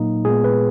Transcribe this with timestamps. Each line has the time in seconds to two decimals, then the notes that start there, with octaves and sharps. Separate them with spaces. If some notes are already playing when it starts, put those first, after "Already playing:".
Already playing: A#2 F#3 A#3 D#4
0.25 A#2 G#3 B3 G#4
0.44 B4